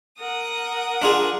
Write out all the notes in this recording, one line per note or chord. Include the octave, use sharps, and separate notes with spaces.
A#4 F#5 D#6
D4 F4 G#4